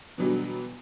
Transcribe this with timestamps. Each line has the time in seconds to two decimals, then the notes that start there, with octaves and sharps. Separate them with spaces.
0.18 B2 D3 E3 F#3 G3